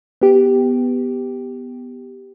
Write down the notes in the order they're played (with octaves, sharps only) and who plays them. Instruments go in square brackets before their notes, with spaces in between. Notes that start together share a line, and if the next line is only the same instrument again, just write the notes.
[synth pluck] B3 G4